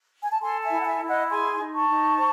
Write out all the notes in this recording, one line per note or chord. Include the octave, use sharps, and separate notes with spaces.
G#5
A5
A4 G#5 C6
E5 G#5
E4
F#5
E5 G#5
E4
D#5 F#5
G#4 G#5 C6
D#4
A5 C#6
D#4
C5